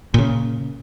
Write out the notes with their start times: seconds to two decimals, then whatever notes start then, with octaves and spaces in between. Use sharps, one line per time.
0.14 A#2 C#3